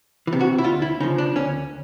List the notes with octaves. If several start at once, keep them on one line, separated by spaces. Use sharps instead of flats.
E3
C3
F#4
E4
D2 F4
E4
C#3 F3 D#4
D4
D2 C#4